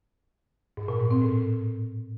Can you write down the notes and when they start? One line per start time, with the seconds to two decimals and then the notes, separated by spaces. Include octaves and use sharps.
0.77 G#2
0.88 A#2
1.00 G#2
1.11 C4
1.22 A2